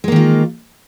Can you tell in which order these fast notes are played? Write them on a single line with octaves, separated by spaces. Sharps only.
G#3 A#3 D#3 F4